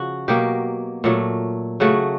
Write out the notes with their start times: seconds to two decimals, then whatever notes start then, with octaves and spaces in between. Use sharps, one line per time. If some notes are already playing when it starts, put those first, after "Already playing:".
Already playing: C#3 F3 F#4
0.28 B2 F#3 A#3 G4
1.04 A#2 F#3 A3
1.80 C#3 F#3 A3 F#4